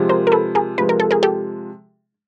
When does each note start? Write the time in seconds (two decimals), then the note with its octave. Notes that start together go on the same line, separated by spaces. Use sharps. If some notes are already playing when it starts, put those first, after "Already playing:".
Already playing: C3 F3 G#3
0.09 A#4 C5
0.27 A#4
0.32 A4 B4
0.55 G#4 A#4
0.78 C3 F3 G#3 B4
0.89 A#4
1.00 A4
1.11 G#4 A#4
1.23 G4 A4